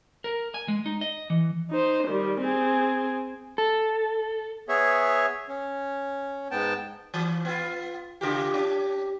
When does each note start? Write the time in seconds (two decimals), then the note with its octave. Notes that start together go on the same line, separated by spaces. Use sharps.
0.24 A#4
0.54 G#5
0.68 G#3
0.86 D#4
1.01 D#5
1.30 E3
1.71 D#4 C5
2.08 D#3 G3
2.41 C4 G#4
3.58 A4
4.69 B3 G#4 C#5 E5
5.48 C#4
6.51 G#2 B3 G5 A5
7.14 E3
7.45 B3 F4
8.21 C#3 F4 G4
8.54 C#4 D4 G4